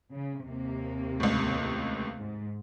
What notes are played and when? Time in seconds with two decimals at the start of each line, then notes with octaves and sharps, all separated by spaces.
0.12 C#3
0.42 D#2 C3 A#3
1.20 C#2 A2
2.20 G#2